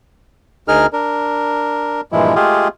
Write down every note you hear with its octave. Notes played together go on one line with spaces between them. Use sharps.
D2 D#4 G#4 A#4 F6
D4 A#4
G2 A#2 E3 F3 G#3 E4
G#3 A3 F4 G4 G#4